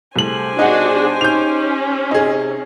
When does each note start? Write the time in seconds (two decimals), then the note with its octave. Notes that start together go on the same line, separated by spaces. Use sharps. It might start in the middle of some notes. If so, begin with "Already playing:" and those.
0.16 C2 A3 G4 G#4 C5 G#5 F#7
0.59 B2 G3 D4 D#4 F#4 G#4 F#5
1.21 C#4 D#4 G6 F7
2.11 C3 D#4 G#4